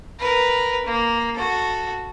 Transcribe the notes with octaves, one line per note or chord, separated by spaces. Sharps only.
A#4 B4
A#3
F#4 A4